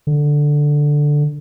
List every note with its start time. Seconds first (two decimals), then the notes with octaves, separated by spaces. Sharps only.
0.07 D3